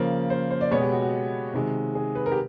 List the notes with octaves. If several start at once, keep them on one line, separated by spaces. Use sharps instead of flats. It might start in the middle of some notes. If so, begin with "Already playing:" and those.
Already playing: C#3 F3 A#3
C5
C5
D5
B2 G#3 B3 C#5
G4
F#4
F#4
C3 D#3 G#3
G#4
B4
A#4
G4